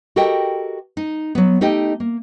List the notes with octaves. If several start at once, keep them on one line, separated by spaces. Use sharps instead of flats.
F#4 G4 A4 A#4 D#5 G5
D#4
F#3 B3
A3 D#4 G4 D#5 G5
A#3